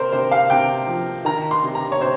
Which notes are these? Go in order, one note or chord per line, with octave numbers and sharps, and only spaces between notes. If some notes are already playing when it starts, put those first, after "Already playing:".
Already playing: C3 A#4 C5
C3 C5
F5
C3 G5
F3
D#3 A#5
C6
C3
A#5
C#5
C3 C5